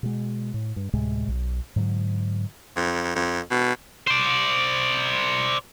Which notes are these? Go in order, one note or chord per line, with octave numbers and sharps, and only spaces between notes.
B2 G#3
A2
G2
D2 A2 C3 G#3
B1
G#2 D3 F#3
F2
F2
B2
C5 D5